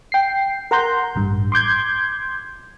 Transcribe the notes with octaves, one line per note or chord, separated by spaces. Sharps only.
G5 C7
A#4 F#5 A#5 C6 G6
A1 G2
C6 D6 G6 G#6